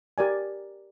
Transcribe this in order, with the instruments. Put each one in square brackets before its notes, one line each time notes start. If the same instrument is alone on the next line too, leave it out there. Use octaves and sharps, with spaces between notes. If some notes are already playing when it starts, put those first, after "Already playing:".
[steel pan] G4 A#4 D5 G#5